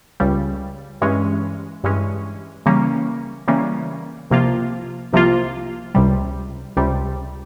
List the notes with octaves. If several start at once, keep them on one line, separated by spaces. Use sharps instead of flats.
C#2 C#3 G3
G2 E3 G#3 C#4
G2 E3 G#3 C#4
C#3 E3 G3 A#3 C#4
C#3 E3 G3 A#3 C#4
C2 C3 F3 A#3 F4
C2 C3 F3 A#3 F4
C#2 C3 G3
C#2 C3 G3